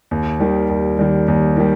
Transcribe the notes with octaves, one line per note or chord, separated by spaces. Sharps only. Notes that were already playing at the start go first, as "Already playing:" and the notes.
D#2
D#3 G3
D#2
D#3 G3
D#2
D#3 G3